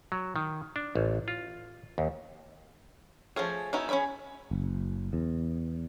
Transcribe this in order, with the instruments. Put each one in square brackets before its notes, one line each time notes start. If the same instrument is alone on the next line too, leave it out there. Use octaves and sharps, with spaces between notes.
[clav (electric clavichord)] F#3
D#3
D4
A1
F4
D#2
[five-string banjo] F3 A3 C#4 G#4
B3 C#4 D#4 E4 F#4
C#4 G#4 D5 G#5 B5
[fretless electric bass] F#1
E2